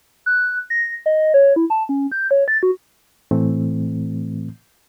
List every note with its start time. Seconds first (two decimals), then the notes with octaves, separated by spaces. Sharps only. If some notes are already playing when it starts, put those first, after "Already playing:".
0.26 F#6
0.70 A#6
1.06 D#5
1.34 C#5
1.56 E4
1.70 A5
1.89 C#4
2.12 G6
2.31 C#5
2.48 A6
2.63 F#4
3.31 A2 E3 A3 C4